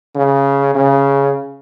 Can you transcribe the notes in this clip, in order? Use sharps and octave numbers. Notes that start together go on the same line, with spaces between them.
C#3
C#3